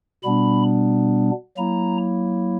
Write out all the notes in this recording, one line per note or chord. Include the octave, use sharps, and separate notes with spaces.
B2 G3 B3 D4 B5
F#3 A#3 E4 A#5